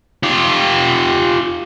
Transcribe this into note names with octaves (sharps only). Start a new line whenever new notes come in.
F4 G4